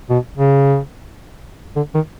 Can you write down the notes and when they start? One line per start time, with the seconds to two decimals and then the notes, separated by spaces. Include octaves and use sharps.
0.10 B2
0.37 C#3
1.76 D3
1.94 D#3